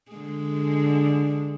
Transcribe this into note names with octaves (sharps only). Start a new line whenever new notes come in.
D3 G#3